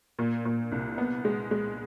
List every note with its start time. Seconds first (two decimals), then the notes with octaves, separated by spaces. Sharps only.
0.19 A#2
0.45 A#2
0.72 C2
0.98 B3
1.25 G#3
1.51 G#3